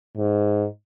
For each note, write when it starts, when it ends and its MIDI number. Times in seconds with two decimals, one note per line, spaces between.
0.17 0.66 44